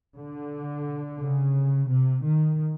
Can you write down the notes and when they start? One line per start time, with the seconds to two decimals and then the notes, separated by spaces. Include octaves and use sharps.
0.17 D3
1.20 C#3
1.88 C3
2.23 D#3